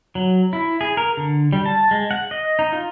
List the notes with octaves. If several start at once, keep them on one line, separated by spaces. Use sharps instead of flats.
F#3
E4
G#4
A#4
D3
G3
A5
G#3
F#5
D#5
D#4
F4